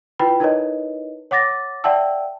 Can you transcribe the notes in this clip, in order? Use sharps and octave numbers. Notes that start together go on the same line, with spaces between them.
E4 F4 B4 G5 B5
D#4 E4 A#4 B4 C#5 D#5
C#5 F#5 D6 A6 A#6
D5 E5 F#5 G5 A5 E6